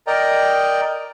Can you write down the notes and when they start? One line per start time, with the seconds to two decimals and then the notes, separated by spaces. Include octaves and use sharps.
0.07 A#4 D5 D#5 G5 A#5